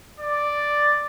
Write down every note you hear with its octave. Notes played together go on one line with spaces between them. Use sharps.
D5